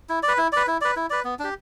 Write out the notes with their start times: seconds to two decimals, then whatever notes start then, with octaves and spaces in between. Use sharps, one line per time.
0.09 E4
0.23 D5
0.28 B4
0.38 E4
0.52 B4 D5
0.67 E4
0.81 B4 D5
0.96 E4
1.10 B4 D5
1.25 B3
1.39 D4 G4